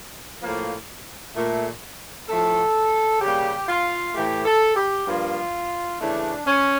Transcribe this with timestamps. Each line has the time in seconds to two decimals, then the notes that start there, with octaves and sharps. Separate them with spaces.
0.42 A2 F3 A#3
1.35 A#2 A3
2.28 A2 F3 A3 A4
3.21 C#3 G3 A#3 G4
3.68 F4
4.15 A2 E3 A3 G4
4.45 A4
4.76 G4
5.07 G2 F3 A#3 F4
6.00 C#3 E3 A3 D4
6.46 C#4